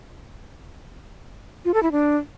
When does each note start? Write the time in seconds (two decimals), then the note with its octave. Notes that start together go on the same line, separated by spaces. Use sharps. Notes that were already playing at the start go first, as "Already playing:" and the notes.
1.65 F4
1.74 A4
1.83 E4
1.92 D4